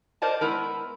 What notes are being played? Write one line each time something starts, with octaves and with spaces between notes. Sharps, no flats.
A#4 C5 D5 D#5 A5
G#3 B3 E4 A#4